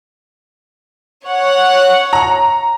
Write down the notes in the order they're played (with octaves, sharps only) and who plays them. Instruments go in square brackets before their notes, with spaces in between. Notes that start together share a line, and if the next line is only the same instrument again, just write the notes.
[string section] C#5 F#5
[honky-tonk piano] A#5